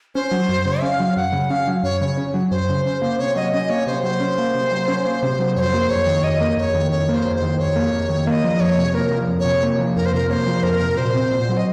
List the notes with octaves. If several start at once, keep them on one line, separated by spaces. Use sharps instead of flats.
C#4 C5
F#3
F#2
C#3
C#4 F5
F#3
F#2 F#5
C#3
C#4 F5
F#3
F#2 C#5
C#3 C#5
C#4
F#3
F#2 C5
C#3
C#4 C5
A#3 C5
C3 C#5
F#3 D#5
C#4 D#5
A#3 C#5
C3 C5
F#3 C5
C#4
A#3
C3
F#3
C#4
A#3
C3
F#3
F2 C5 C#5
A#3
F2 C#5
D#3
F2 D#5
A#3
F2 C#5
D#3
F2 C#5
A#3
C5
F2
C5
D#3
F2 C#5
A#3
F2
D#3
A#3 D#5 F5
F3
F2 C#5
C3
A#3 A#4
F3
F2
C#5
C3
A#3
F3
F2 A#4
C5
C3 A#4
A#3 C5 C#5
F3
F2 A#4
C3
A#2 C5
C4
A#2
F#3
D#5